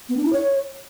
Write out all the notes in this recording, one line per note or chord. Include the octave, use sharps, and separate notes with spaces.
B3
D4
E4
C#5